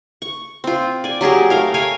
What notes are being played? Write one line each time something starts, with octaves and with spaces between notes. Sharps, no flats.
C#6
C4 F4
D5 G#5
F#3 G4 G#4 A#4
A3 A#4 F5
A#4 C#5 F5 G#5